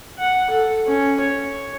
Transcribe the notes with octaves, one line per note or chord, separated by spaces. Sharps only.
F#5
A4
C#4
C#5